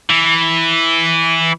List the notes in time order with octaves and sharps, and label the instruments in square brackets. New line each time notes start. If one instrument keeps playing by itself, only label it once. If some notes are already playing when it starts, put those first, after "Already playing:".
[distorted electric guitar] E3